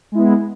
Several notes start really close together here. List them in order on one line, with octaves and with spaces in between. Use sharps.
G#3 E4 B3